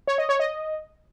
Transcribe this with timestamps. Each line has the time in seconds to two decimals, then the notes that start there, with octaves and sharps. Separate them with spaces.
0.07 C#5
0.18 D#5
0.29 C#5
0.40 D#5